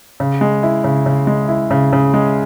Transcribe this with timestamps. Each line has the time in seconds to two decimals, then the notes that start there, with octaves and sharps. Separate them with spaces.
0.20 C#3
0.41 G#3
0.63 E4
0.84 C#3
1.06 C#3
1.27 G#3
1.49 E4
1.71 C#3
1.93 C#3
2.14 G#3